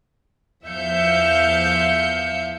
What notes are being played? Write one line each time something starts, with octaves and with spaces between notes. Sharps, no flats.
E2 F3 E5 F5 G6 C#7